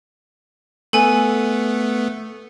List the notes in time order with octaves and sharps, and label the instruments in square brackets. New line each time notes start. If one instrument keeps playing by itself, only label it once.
[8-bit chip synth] A3 B3 [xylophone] A4 G#5